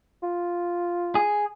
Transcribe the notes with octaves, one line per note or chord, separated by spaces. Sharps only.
F4
G#4